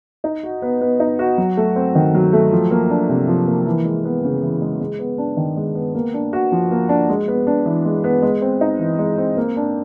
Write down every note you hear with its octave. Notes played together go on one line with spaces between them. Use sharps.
D#4
F#4
B3
B3
D#4
F#4
F#3
A3
C4
D#3
F#3
A3
F3
A#3
D4
C3
F3
A#3
E3
G#3
B3
C#3
E3
G#3
G#3
B3
D4
D#3
G#3
B3
A#3
D4
F#4
F3
A#3
D4
G#3
B3
D4
E3
G#3
B3
G#3
C4
D#4
E3
G#3
C4
A#3
D4